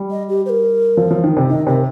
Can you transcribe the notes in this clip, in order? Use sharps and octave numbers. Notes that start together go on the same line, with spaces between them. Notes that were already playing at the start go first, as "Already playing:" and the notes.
Already playing: G3
D#5
G4
C5
A#4
F3
F3
D#3
C3
D#3 D#5
C3 A#4